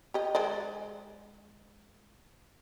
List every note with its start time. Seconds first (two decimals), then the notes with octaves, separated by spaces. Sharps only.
0.14 G4 D#5
0.35 G#3 C5 D5